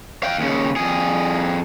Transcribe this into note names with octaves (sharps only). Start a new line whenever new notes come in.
F5 G5
D#2 C#3
F2 G#4